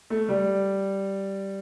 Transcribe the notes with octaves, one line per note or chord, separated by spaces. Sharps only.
A3
G3